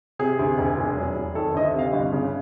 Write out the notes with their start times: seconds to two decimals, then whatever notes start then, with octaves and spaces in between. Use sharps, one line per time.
0.19 C3 G#4
0.39 D2
0.58 E1
0.77 F1
0.96 F#3
1.16 F1
1.35 D#3 A4
1.54 D2 D#5
1.64 E5
1.74 C3 F5
1.93 G1
2.12 C#3